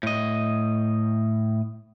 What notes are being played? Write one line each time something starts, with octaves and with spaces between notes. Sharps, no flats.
A2 D#5